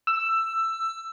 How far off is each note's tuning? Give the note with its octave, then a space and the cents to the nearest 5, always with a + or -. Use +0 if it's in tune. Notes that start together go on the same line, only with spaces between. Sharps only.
E6 +10